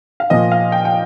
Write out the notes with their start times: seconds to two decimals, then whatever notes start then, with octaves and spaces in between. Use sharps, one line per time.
0.20 F5
0.30 A#2 F3 A#3 D#5
0.52 F5
0.72 G5
0.85 G5